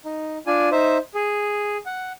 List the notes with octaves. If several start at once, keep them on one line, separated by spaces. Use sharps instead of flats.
D#4
D4 F4 D5 G#5
D#4 C5 E5
G#4
F#5